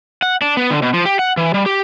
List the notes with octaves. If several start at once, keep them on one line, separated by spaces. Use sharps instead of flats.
F#5
D4
B3
D3
B2
F3
G4
F#5
E3
G3
G4